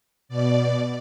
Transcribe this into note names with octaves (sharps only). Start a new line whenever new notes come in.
B2 D5